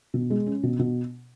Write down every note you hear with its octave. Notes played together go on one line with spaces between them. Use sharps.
B2
G#3
C#4
B2
B2